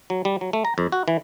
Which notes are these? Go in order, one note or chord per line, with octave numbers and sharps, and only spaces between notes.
F#3
G3
F#3
A3
A#5
F2
F#4
E3